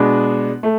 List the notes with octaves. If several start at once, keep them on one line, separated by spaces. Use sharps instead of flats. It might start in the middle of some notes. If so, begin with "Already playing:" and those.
Already playing: B2 G#3 B3 D4
A3